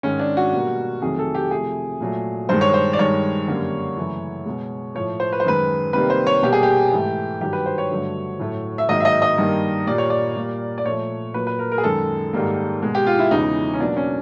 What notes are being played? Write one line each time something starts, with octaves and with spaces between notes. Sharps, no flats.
G#2 D#3 G#3 C#4
D4
F#4
B2 G3 A#3
F2 C3 D#3 F#3 A3 G#4
A4
G4
C3 F3 A3 G#4
A#2 F#3 A3
G2 D#3 G#3 C5
C#5
C5
D5
G2 D#3 G#3 C#5
F#2 D3 G3 A#3
F#2 C#3 E3 A3
B2 G#3
A2 F3 A3 C#5
C5
B4
C5
F#2 D#3 G#3 B4
C3 D#3 G3 A#3 B4
C5
C#5
B2 G3 A#3 G4
G#4
G4
G#2 E3 A3
G2 D#3 F#3 G4
B4
C5
C#5
G2 D3 F#3 A3
A2 F#3 A3
E5
G#2 D#3 F#3 A#3 D#5
E5
D#5
D#5
G2 D#3 G3 A#3
A#2 G3 A#3 D5
C#5
D5
A#2 G3 A#3
D5
A#2 F3 A3 C#5
A#2 F#3 A#3 B4
B4
A#4
A#4
G#4
F#2 D#3 G#3 A4
G#2 D#3 G3 A#3
B2 G#3
G4
F4
E4
E2 C#3 E3 G#3 D#4
C#4
B2 F#3 A#3 D4
C#4